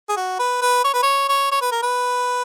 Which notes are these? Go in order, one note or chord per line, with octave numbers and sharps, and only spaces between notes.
G#4
F#4
B4
B4
C#5
B4
C#5
C#5
C#5
B4
A#4
B4